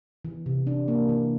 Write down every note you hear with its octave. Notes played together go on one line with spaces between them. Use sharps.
E3
C3
D4
A#3
E3